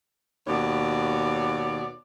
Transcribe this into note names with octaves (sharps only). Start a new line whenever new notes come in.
D#2 B2 C#5 D5